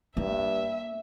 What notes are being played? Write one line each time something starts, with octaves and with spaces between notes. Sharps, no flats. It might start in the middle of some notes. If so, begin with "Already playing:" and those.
G2 A#3 E5